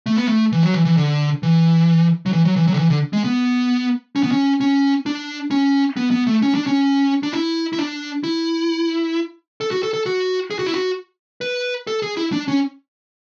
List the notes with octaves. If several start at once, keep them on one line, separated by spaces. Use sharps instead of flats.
A3
B3
A3
E3
F#3
E3
E3
D3
E3
F#3
E3
F#3
E3
F#3
D3
E3
D3
G#3
B3
C#4
B3
C#4
C#4
D4
C#4
B3
B3
A3
C#4
D4
C#4
D4
E4
E4
D4
E4
A4
F#4
A4
A4
F#4
G#4
F#4
E4
F#4
B4
A4
G#4
E4
D4
C#4